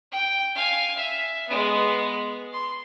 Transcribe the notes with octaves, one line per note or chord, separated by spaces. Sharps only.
G5
F5 G#5
E5
G#3 B3
C6